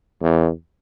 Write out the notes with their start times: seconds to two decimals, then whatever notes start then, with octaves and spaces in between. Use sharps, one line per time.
0.22 E2